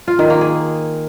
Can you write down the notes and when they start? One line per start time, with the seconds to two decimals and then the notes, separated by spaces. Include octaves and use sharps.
0.08 F4
0.19 D#3
0.30 A#3
0.41 G#4